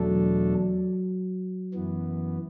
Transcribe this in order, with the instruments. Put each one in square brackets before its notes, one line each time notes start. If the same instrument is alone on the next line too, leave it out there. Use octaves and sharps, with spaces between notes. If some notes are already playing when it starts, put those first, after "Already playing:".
Already playing: [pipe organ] E2 B2 A3 D4 A4 [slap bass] F#3
[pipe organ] F#2 E3 B3